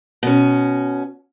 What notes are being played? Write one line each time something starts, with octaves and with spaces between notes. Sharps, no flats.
B2 C#4